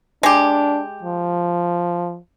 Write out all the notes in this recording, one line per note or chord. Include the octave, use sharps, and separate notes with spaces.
G#3 D4 G4
F3